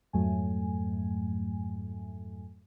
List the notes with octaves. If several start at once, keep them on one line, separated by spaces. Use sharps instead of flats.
F2 G#2 F#3 A3 G#5